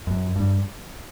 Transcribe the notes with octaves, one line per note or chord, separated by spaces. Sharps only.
F#2
G2